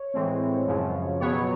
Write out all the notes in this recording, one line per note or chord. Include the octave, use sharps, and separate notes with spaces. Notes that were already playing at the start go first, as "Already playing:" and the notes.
Already playing: C#5
A2 E3 G#3 C4
F#2 C#3 F3
B2 F#3 B3 C#5